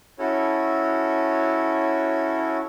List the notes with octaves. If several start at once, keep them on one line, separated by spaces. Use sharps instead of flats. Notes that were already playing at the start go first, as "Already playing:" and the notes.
C#4 E4 F#4 A4 C#5